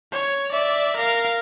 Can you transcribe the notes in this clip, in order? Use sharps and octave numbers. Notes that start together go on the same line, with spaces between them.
C#5
D5 E5
A#4 F5